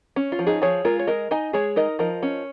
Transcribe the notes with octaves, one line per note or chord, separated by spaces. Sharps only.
C#4
F4
F3
D#4 G#4
F3 G#4 C#5
G#3 F4 A#4
C#5
G#3 A#4 D#5
D#4 D#5 G#5
G#3 G#4 C#5
D#4 A#4 D#5
F3 A#4 D#5
C#4